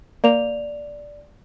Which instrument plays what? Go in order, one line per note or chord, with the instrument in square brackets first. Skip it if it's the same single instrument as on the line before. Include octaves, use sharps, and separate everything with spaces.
[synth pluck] A#3 [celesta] D5 F7